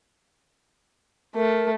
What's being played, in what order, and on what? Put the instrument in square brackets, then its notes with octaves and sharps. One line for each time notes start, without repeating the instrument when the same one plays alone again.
[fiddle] A3 [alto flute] A#4